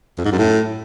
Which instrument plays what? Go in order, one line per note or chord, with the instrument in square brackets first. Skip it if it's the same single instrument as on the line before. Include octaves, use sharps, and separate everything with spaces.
[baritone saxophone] F2
G#2
F#2
A2